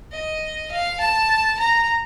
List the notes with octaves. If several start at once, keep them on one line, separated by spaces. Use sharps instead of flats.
D#5
F5
A5
A#5